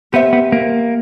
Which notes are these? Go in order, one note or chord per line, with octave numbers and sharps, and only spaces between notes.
B3 G4 C5 E5
B3
A#3